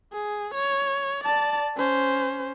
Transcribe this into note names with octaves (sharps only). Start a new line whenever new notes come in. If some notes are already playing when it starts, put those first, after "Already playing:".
G#4
C#5
D5 A5
C#4 C5